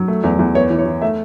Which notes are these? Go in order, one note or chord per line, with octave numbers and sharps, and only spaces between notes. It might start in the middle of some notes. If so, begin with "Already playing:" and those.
Already playing: F#3
A3
E2
E2
B3 C#5
E3
C#5
E3
A3 E5